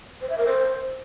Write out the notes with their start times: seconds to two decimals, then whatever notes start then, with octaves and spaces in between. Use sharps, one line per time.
0.21 C5
0.29 E5
0.38 A#4
0.46 C5